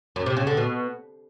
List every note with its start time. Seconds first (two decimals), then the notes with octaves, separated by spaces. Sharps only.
0.16 F#2
0.26 C3
0.37 C#3
0.47 D3
0.57 B2